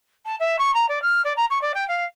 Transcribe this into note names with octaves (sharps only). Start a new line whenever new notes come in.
A5
E5
C#6
A#5
D5
F6
D5
A#5
C#6
D5
G5
F5